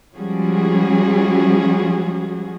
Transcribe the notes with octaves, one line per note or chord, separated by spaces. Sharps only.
F3 G3 G#3 C#4 F#4 G#4